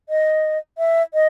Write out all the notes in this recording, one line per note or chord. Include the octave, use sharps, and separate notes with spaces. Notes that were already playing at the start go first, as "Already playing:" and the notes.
D#5
E5
D#5